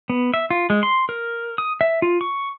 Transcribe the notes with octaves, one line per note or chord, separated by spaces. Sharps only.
B3
E5
F4
G#3
C6
A#4
D#6
E5
F4
C#6